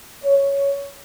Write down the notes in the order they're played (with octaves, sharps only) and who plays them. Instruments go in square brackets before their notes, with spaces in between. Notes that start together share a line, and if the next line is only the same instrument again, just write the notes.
[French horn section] C#5